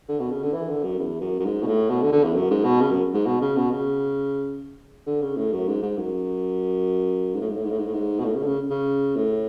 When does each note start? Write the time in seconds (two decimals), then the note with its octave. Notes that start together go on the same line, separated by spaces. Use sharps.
0.09 D3
0.20 B2
0.31 C#3
0.43 D3
0.53 E3
0.69 D3
0.84 F#2
0.99 E2
1.21 F#2
1.40 F#2
1.45 G#2
1.63 B2
1.67 A2
1.90 B2
2.01 D3
2.12 D3
2.24 E2
2.35 F#2
2.51 G#2
2.65 B2
2.81 C#3
2.91 F#2
3.14 G#2
3.26 B2
3.41 C#3
3.57 B2
3.71 C#3
5.07 D3
5.22 C#3
5.37 A2
5.52 F#2
5.68 G#2
5.83 G#2
5.98 F#2
7.35 G#2
7.41 A2
7.50 G#2
7.56 A2
7.64 G#2
7.71 A2
7.79 G#2
7.86 A2
7.93 G#2
8.20 B2
8.25 A2
8.35 C#3
8.43 D3
8.47 C#3
8.70 C#3
9.16 A2